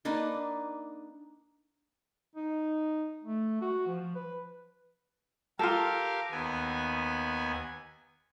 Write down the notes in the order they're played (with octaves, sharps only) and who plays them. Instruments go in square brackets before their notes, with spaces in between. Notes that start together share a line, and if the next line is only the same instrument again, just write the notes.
[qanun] A#3 D4 D#4 B4
[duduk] D#4
A3
F#4
F3
B4
[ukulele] F4 A4 [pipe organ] G4 A#4 F5
[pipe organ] D#2 B3 G#5